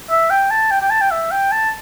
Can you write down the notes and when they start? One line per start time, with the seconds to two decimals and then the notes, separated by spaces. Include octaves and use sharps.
0.10 E5
0.31 G5
0.51 A5
0.71 G5
0.81 G5
0.91 A5
1.01 G5
1.11 E5
1.31 G5
1.52 A5